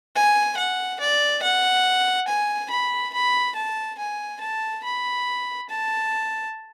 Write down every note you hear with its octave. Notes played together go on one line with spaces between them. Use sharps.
G#5
F#5
D5
F#5
G#5
B5
B5
A5
G#5
A5
B5
A5